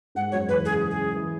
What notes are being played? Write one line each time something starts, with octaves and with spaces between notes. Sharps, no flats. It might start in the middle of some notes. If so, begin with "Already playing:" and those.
G#2 G#3 F#5
F#2 F#3 C#5
E2 E3 B4
C#3 G#4
C#3 G#4
E3